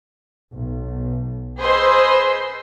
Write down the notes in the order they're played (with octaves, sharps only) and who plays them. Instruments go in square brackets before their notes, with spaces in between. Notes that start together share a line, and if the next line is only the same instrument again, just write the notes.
[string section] B1
G#4 B4 C5 D#5 C6 E6